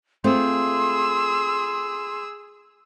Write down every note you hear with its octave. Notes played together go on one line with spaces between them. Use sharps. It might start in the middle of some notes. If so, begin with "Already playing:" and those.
A3 C4 F4 G#4 C6 E6